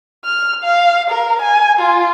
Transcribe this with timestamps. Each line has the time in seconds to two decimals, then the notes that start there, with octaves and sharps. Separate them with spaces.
0.25 F6
0.64 F5
1.10 A#4
1.42 G#5
1.79 F4